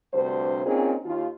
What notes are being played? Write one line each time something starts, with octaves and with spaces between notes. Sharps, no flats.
D2 G2 C3 C5
A#2 C4 C#4 D#4 F4 G#4
D#2 F4